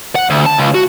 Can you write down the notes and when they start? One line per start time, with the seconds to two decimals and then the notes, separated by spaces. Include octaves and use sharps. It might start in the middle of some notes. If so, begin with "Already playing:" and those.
0.15 F#5
0.30 D2
0.46 A5
0.58 C#2
0.74 F#4